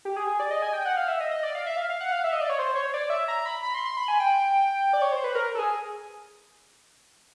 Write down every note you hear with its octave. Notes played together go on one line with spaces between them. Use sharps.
G4
G#4
G#4
D5
D#5
G#5
G5
F#5
F5
E5
D#5
D#5
D5
F5
E5
F5
F5
F#5
F5
E5
D#5
D5
C#5
C5
C#5
D5
E5
A#5
B5
B5
C6
C6
B5
G#5
G5
D5
C#5
C5
B4
A#4
A4
G#4